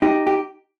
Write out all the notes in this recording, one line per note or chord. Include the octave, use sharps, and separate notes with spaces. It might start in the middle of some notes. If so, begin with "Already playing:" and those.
D#4 G4
G4